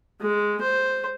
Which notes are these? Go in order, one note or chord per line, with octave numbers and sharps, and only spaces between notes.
G#3
C5